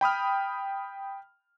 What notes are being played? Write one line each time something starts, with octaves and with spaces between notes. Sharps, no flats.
G5 B5 D#6 F6